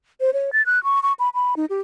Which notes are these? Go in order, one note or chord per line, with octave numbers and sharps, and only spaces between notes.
C5
C#5
A6
F#6
C#6
C#6
B5
B5
D#4
G4